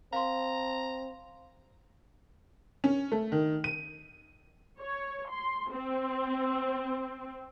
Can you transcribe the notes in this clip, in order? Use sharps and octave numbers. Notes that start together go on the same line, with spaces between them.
C4 F5 A#5 C6
C#4
A3
D#3
D#7
C#5
C6
C4